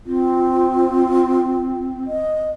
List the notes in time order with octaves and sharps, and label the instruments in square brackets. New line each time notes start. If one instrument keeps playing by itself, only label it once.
[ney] C4 [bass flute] F4
[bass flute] D#5